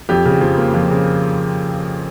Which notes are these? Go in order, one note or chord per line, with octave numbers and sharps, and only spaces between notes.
F2 G4
C#3
F3
A#3
F2
C#3